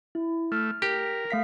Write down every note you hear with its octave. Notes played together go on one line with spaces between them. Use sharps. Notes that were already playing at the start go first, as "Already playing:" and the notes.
E4
A3 F6
G4 A#4
A3 F5 B6